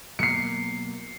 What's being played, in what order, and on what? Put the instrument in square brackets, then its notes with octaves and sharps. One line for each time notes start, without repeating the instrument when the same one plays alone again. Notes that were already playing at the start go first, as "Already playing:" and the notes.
[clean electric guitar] B2 F#3 A#3 [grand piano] C7 C#7